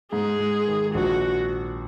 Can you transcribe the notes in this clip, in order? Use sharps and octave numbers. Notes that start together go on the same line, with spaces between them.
G#2 G#4
G#3
D#3
A#1 F#4